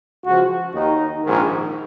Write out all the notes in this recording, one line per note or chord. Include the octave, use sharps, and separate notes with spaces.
C#2 C#3 F3 F#4
D#2 D#3 D#4
A#1 G#2 D#3